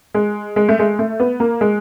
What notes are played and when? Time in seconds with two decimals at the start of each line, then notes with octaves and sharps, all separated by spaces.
0.14 G#3
0.56 G#3
0.69 A3
0.79 G#3
0.99 A3
1.20 B3
1.40 A#3
1.61 G#3